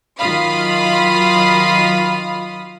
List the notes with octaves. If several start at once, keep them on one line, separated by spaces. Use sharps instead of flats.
D#3 F#3 F4 F5 B5 D#6